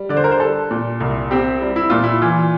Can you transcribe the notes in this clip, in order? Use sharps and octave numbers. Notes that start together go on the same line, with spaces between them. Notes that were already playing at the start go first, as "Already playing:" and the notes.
Already playing: G3
D3 D5
C5
A#4
C5
G3 A4
A#2
C2
C4 G4
G3
E4
A#2 F4
E4
E3 F4